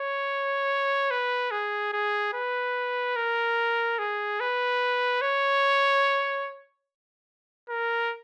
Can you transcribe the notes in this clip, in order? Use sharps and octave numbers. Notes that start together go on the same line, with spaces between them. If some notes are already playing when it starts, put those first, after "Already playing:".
Already playing: C#5
B4
G#4
G#4
B4
A#4
G#4
B4
C#5
A#4